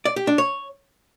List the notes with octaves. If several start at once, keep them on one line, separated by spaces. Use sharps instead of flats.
D5
G4
D4
C#5